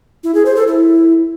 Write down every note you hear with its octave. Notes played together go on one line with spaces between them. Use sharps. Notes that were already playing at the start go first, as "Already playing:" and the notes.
E4
G#4
C5
A4
E4